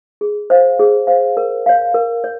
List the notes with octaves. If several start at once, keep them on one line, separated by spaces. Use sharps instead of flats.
G#4
C5 F5
G#4
C5 F5
A#4
C#5 F5
A#4
C#5